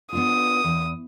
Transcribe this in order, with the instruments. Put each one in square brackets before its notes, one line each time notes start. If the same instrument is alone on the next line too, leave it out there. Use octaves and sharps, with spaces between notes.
[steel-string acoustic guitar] B3 D4 F4 [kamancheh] D#6
[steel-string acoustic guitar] E2